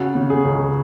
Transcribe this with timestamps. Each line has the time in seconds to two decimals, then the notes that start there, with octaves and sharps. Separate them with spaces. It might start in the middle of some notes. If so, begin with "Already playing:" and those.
Already playing: C#3 F#4
0.15 C#3
0.30 G#4
0.45 C#2